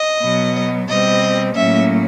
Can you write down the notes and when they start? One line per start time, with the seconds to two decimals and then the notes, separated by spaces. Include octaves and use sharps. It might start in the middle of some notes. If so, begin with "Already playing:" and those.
Already playing: D#5
0.22 B2 F#3 B3
0.88 B2 G3 C4 D#5
1.54 A2 F#3 A#3 C#4 E5